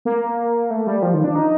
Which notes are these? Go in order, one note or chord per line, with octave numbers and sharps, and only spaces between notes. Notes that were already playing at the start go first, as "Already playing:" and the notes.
A#3
A3
G3
F3
D#3
D4
D#4